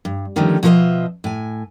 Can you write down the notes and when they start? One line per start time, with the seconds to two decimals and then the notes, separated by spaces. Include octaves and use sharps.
0.05 G2
0.36 D3 D#3 F3 G3 A3 C#4
0.63 B2 F3 F4 A4 D#5 E5
1.24 A2 G#5